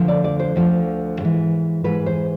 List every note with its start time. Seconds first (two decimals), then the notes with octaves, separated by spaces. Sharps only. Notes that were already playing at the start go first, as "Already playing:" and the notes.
Already playing: D2 D3 F3
0.08 D5
0.24 D5
0.39 C5
0.56 D2 D3 F3
1.21 G#2 E3
1.84 G#2 E3 B4
2.06 C5